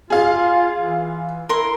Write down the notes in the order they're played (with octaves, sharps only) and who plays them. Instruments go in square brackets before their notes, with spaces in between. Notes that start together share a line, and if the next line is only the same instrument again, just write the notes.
[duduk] F4 [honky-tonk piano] G#4 F5
[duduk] E3
[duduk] E4 [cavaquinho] A#4 C6